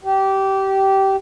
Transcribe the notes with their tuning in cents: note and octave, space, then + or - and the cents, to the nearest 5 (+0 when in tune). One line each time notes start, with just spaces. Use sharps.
G4 -20